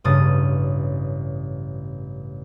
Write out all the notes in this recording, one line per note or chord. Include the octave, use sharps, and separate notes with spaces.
A1 G2 C#3 D#6 A6